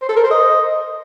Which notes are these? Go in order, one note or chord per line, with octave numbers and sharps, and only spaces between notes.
C5
A4
A#4
C5
D#5